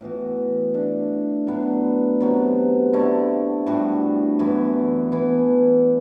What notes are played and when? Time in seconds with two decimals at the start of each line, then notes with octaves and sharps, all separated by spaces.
0.01 A2 E3 B3 F#4
0.74 D3 A3 D4
1.47 A2 F#3 B3 D4
2.20 C3 F#3 B3
2.93 D3 A3 E4
3.66 A2 G3 D4 F#4
4.39 F#2 E3 B3 E4
5.12 E3 B3 E4